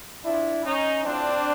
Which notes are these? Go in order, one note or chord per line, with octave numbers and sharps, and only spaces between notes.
C3 F3 D4 E4
C#4 D#4
A2 F3 C4 D4